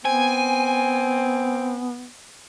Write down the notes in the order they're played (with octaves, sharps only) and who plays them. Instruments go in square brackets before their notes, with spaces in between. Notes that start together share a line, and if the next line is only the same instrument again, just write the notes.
[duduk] B3 [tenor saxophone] C4 [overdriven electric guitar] G#5